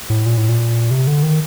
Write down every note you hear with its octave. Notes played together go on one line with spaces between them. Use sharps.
A2
A#2
A2
A#2
C3
D3
D#3